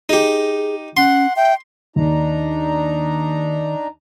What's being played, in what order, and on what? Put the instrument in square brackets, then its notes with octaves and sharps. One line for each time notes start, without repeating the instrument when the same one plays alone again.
[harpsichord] D#4 G4 [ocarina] G#4
[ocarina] C#4 [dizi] F#5 [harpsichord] C6
[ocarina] E5 [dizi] G5
[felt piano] D#2 [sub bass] D#3 [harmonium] D4 D#4 A#5